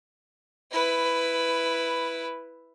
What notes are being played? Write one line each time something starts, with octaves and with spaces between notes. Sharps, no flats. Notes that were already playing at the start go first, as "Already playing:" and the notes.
E4 B4